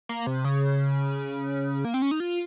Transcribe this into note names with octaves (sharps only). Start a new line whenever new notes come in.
A#3
C3
C#3
A#3
C4
C#4
D#4
F4